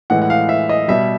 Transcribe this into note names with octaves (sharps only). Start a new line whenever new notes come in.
A2 E3 G#3 F#5
F#5
F5
E5
D#5
B2 G3 E5